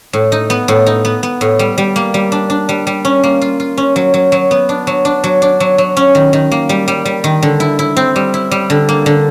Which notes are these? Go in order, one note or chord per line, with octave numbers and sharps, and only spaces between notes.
A2
D#4
B3
A2
D#4
B3
B3
A2
G3
G3
A#3
G3
D4
D4
G3
G3
C#4
A#3
F4
F4
C#4
F#3
F#3
F#3
B3
D4
F#3
D4
F#3
D4
F#3
F#3
C#4
D#3
D#3
A#3
G3
G3
G3
D#3
D3
E4
E4
C4
G3
E4
G3
D3
A#3
D3